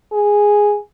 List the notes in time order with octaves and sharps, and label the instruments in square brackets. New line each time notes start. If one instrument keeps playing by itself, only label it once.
[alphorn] G#4